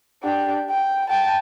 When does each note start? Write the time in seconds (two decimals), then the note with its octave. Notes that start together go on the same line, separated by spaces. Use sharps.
0.23 D4 G4
0.70 G5
1.09 G5 A5